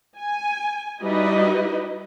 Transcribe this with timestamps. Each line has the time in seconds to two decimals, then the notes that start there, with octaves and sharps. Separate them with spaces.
0.17 G#5
1.02 G3 D#4 E4 F#4 B4 D#5